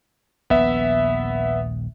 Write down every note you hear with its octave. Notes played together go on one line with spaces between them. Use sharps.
D#1 A#1 B3 E5